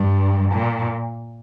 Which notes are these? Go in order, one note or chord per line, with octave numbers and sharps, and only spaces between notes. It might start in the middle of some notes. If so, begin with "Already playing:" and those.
Already playing: G2
A#2